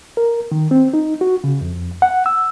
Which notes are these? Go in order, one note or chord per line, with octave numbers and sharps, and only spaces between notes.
A#4
D#3
C4
D#4
F#4
C#3
F2
F#5
E6